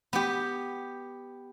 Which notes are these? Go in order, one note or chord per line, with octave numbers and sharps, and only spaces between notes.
B3 G4